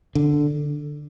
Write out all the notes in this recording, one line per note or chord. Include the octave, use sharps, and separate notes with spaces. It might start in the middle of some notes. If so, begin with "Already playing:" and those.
D3